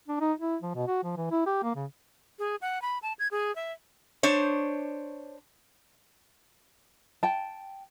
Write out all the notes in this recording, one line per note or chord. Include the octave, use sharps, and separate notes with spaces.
D4
D#4
E4
F3
B2
F#4
F3
E3
E4
G4
A#3
C#3
G#4
F#5
B5
A5
G#6
G#4
E5
D4 C5 C#5
G5 A5